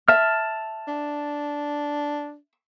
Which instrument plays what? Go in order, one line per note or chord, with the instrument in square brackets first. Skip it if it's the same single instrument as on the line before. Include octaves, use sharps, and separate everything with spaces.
[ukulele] E5 [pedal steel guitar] A5 F6
[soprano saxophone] D4